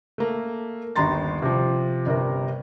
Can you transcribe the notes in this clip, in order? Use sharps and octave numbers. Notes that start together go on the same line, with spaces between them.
A3 A#3
G1 D#2 A#5 C6 A6
C3 F3
G1 C3 A#4